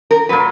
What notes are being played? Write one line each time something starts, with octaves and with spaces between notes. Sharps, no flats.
A#4
A#2 F#3 B4